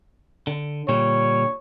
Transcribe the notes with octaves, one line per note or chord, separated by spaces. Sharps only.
D3
A#2 D3 G3 C#5